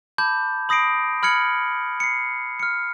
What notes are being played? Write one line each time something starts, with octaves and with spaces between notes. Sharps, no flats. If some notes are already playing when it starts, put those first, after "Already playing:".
A5 B5 D6 G6
B5 D#6 A#6 C7 D7
B5 F6 G#6 C#7 F#7
C7 C#7
F6 C#7